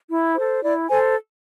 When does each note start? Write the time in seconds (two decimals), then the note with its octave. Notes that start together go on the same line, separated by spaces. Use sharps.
0.10 E4
0.36 A4 C5
0.62 E4 D5
0.88 A4 C5 G#5